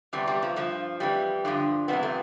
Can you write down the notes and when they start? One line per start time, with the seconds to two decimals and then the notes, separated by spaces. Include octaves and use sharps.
0.13 E2 C3 E3 G3
0.27 G3
0.42 F3
0.56 G2 F3
1.00 F2 E3 G3
1.45 G2 D3 F3
1.88 F2 C3 E3 B3
2.03 A3